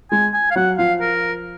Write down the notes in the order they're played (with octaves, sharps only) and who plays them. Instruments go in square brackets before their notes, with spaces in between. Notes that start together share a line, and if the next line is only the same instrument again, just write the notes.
[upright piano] G#3 [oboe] G#5
[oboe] G#5
F5
[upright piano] F#3 [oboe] F#5
[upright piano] F3 [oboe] F5
[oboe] A#4